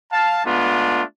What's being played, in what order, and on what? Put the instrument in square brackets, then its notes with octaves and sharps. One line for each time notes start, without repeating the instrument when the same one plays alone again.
[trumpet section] F5 A5
G#3 A3 B3 D4 F4